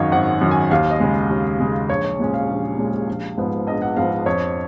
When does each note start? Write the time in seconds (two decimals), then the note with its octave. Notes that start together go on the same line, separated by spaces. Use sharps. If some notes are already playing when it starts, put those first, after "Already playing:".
Already playing: G#1 F#2 D#3 C#5 D#5 F5
0.12 G#1 F#5
0.41 F#2 D#3
0.51 G#5
0.71 D#2 F5
0.91 D#5
1.00 C#3 G#3
1.30 D#2
1.60 C#3 G#3
1.90 A#1 C#5
2.04 C#5
2.19 A#2 G#3 C#4
2.34 F5
2.49 A#1
2.78 A#2 G#3 C#4
3.08 A#1
3.38 G#2 F3 B3
3.67 A#1 D#5
3.82 F#5
3.97 G#2 F3 B3 F5
4.26 F2 C#5